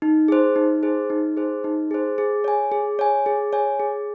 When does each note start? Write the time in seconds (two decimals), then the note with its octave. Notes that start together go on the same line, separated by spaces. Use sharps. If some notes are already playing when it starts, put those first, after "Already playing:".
0.02 D#4
0.28 G#4 C5
0.56 D#4
0.83 G#4 C5
1.10 D#4
1.37 G#4 C5
1.64 D#4
1.91 G#4 C5
2.18 G#4
2.44 C#5 G#5
2.72 G#4
2.99 C#5 G#5
3.26 G#4
3.53 C#5 G#5
3.80 G#4